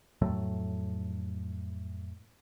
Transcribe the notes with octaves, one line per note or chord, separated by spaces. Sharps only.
F2 A2 F#3 A3